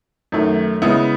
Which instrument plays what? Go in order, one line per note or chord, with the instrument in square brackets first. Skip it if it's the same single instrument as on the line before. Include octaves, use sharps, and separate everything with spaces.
[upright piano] F#2 D#3 A3
C#3 G#3 B3 E4